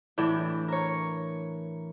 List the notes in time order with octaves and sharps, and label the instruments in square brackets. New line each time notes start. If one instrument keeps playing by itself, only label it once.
[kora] A2 D4 G5 [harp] E3
[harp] A#4 C#5